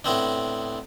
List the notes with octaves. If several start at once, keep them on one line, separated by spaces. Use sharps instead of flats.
A2 B3 C4 D4